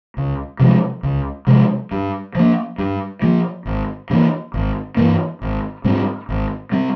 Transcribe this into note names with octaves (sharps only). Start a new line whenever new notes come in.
C#2
C3 F3 G#3
C#2
C3 F3 G#3
G2
F3 A#3
G2
F3 A#3
G#1
G2 E3 A#3
G#1
G2 E3 A#3
G#1
G#2 G3 C4
G#1
G3 C4